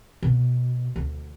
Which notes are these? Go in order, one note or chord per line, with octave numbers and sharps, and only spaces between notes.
B2
D2